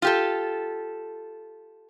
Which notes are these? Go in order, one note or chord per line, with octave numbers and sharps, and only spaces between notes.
F4 G4 A4